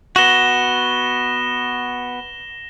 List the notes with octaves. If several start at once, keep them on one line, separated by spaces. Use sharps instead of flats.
B3 F#4 A#6 E7 G7